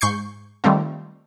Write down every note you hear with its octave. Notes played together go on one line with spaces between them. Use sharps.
G#2 C#6 G6 C7
D#3 G3 A3 C4 F4